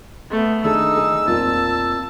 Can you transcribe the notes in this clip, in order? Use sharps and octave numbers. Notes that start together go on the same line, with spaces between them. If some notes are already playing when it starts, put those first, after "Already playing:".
A3 B3
D#3 D4 D#4 G#4 A4 E6
G#4
E2 A#2 C4 F4 A5